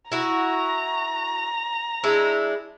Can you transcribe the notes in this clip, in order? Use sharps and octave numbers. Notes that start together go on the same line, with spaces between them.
E4 F#4 A#5
G#3 D4 E4